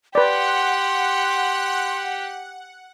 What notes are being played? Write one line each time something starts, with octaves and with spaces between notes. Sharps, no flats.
G4 B4 D5 F#5 C6